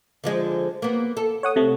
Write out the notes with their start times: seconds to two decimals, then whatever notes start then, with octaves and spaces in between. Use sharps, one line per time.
0.24 D3 F3 G#3
0.82 A#3 B3
1.17 A4
1.43 C#5 F#5 D#6
1.56 C3 A3